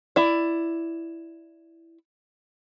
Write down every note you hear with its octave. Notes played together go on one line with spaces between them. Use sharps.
E4 D5